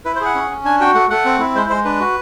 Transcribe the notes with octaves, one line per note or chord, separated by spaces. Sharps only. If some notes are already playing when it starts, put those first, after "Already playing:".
E4 B4
C5
G#4 F#5
C#4
C#4
D4 G#5
F#4 G5
A3 F#5
A3 F#5
C4
E4
G#3 C5
G#3 C5
D4 B4
F#4